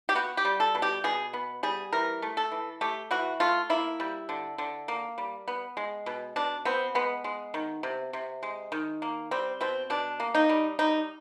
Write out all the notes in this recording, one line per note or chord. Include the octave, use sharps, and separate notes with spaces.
G4
B3 F#4
G4
G3
A4
B2
G4
B2 G#4
B3
G3 G#4
E3 A#4
A3
A4
E3
A3 G4
E3 F#4
A3 F4
A#3 E4
G3
D3
D3
A#3
G3
B3
G#3
B2
B2 D4
B3 C4
G#3 B3
G#3
D#3
C3
C3
G#3
D#3
A#3
G3 C4
B2 C4
B2 D4
A#3
D#4
G3
G3 D#4